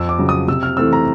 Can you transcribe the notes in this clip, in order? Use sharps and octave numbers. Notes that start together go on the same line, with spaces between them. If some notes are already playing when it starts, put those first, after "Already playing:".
Already playing: F2 E6
D6
C#3 F#3
D#6
C3 E6
F6
E3 A3 C4 E6
A#5